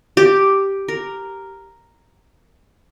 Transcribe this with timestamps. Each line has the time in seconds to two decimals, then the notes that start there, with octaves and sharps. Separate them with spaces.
0.17 G4
0.88 A#4